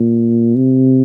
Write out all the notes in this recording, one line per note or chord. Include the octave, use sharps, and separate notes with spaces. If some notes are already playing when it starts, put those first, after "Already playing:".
Already playing: A#2
C3